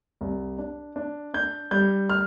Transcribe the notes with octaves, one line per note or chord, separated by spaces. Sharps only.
C2
D4
D4
D4 G6
G3 G6
F6